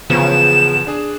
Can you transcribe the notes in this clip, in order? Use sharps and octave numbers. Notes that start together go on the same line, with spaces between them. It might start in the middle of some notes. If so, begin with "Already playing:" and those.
E2 C#3 F3 B3 E7
D4 G#4